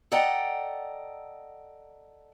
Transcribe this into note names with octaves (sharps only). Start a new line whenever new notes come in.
A4 D5 D#5 F#5 G5 A#5